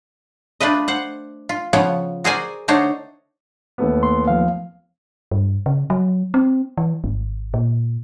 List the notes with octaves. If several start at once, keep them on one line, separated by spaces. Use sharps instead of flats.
A3 D4 F4 B4 D#5
C5 F#5
F4
C#3 F3 B3 C#4 C#5
F#4 G#4 A#4 C5 D5 G#5
D3 A3 D4 D#4 C5 C#5
D#2 A3 B3
C6
F3 F5
G2
C#3
F#3
C4
E3
G#1
A#2